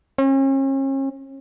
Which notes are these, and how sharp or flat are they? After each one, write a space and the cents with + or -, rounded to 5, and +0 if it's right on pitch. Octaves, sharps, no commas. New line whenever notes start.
C#4 -40